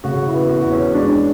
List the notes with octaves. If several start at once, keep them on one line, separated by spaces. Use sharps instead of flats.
C#3 F#4
E4
B3
F#4
E2
C#4
G#3 D4